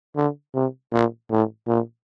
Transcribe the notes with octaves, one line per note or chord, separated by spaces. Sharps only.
D3
C3
A#2
A2
A#2